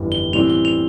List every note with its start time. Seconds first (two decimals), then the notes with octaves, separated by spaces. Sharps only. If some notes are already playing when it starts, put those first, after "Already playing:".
Already playing: G1 F2 E3 G3
0.12 G7
0.32 A2 E3 G3 C4 F7
0.50 G7
0.65 F7